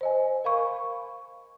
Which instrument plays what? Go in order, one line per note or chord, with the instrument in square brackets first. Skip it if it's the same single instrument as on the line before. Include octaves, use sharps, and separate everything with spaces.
[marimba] C5 D#5 G#5
A#4 F5 B5 C#6